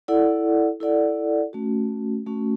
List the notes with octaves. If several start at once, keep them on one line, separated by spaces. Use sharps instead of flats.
E4 A4 D5 F#5
E4 A4 D5 F#5
A3 C#4 F#4
A3 C#4 F#4